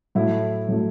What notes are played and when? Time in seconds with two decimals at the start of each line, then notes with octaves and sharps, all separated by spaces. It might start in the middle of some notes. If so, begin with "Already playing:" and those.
0.15 A2 F#3 A3 E4
0.68 A2 F#3 A3